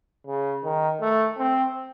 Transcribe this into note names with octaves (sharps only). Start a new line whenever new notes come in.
C#3
D#3
A3
C4